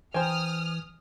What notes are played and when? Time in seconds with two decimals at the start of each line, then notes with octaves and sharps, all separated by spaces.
0.14 E3 C5 G5 G#5 A#5 D#6 F6